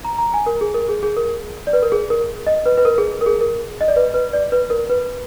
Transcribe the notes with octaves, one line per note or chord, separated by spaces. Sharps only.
A#5
A#5
G#5
A#4
G#4
A#4
G#4
G#4
A#4
D5
B4
A#4
G#4
A#4
D#5
B4
B4
A#4
G#4
A#4
G#4
A#4
D#5
D5
B4
B4
D5
B4
A#4
B4